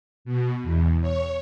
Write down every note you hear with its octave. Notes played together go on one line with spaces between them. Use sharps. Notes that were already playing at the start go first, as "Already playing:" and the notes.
B2
E2
C#5